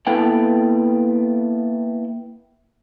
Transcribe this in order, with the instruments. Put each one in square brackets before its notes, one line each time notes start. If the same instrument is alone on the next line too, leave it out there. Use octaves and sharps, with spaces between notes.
[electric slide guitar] A#3 B3 E4 A4 B4 G5